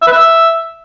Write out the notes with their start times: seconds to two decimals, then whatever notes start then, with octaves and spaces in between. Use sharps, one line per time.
0.02 E5
0.07 B4
0.12 E5